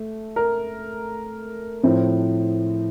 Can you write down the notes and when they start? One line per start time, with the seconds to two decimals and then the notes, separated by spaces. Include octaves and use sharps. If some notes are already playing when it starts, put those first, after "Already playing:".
Already playing: A3
0.36 A#4
1.83 A2 F3 C4